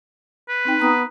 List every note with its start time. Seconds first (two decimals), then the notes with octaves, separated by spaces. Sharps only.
0.49 B4
0.65 C4 D#4 G5
0.80 B3 A#5 D#6